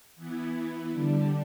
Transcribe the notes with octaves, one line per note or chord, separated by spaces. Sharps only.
E3 B3 E4
D3 G3 D4